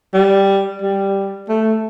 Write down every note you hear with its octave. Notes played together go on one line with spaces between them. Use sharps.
G3
G3
A3